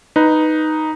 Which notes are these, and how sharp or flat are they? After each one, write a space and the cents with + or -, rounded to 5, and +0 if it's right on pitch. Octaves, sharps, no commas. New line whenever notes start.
D#4 +0 B4 +0